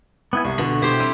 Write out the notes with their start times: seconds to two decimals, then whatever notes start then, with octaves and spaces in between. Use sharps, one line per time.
0.33 B3 E4 G#5
0.45 C2 C#6
0.58 B2 D3 F#7
0.82 B2 E4 G4 C5
1.00 G3 C4 C5